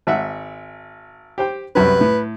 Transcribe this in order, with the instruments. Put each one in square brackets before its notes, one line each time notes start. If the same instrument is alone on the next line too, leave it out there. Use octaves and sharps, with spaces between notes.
[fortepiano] G#1 E5 F#5
G4 C5 G5
[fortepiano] C2 F#2 C#4 [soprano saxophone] B4
[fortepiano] A2